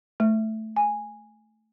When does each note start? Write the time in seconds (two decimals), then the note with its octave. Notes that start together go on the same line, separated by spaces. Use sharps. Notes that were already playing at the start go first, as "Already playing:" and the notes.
0.20 A3
0.76 G#5